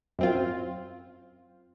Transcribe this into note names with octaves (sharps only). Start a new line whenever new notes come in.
F#2 C4 F4